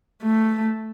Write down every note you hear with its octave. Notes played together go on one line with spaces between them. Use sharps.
A3